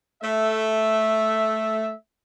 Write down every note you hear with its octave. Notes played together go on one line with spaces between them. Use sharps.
A3 E5